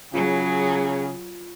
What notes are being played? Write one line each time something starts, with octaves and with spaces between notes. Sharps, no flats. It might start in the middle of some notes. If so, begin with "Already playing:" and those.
C#3 F#3 F4 G#4